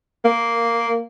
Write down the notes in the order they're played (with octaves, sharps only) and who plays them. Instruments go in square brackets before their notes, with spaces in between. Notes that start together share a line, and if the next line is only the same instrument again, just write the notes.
[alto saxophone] A#3